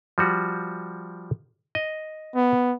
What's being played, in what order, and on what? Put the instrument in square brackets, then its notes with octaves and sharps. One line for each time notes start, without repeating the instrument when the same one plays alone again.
[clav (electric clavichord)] F3 G3 F#4
D#5
[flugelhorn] B3